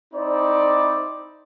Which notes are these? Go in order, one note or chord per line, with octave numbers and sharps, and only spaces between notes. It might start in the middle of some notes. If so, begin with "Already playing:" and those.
C4 D#4 E4 C5 D5